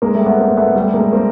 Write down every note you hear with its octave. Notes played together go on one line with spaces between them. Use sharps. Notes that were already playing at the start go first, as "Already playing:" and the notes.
G#3 A#3
G3 A3
A3 B3
A#3 C4
A#3
A3 B3
G#3
G3 A3
G#3 A#3
A#3 C4